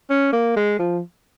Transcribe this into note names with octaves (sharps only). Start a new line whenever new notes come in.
C#4
A#3
G#3
F3